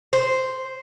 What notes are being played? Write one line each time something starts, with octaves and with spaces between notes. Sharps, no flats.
C5